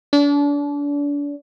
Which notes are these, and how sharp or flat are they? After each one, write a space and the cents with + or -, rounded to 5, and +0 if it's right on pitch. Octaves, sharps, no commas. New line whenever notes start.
D4 -35